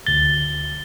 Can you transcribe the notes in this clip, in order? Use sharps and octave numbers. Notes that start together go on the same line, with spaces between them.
D2 A6 G7